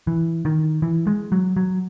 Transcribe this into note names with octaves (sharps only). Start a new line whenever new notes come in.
E3
D#3
E3
G#3
F#3
F#3